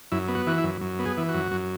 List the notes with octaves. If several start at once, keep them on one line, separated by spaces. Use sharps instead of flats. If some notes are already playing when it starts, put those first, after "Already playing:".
F#2 E4
B3
F#4
E3 F#4
E4
F#2
F#2
B3
G#4
E3
F#4
F#2
F#2